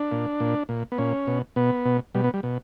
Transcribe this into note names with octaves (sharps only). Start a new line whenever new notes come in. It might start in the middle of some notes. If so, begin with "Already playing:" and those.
Already playing: D4
A#2
A#2
A#2
B3
A#2 C#4
B2
B2 B3
B2
B2 G3
B3
G3
B2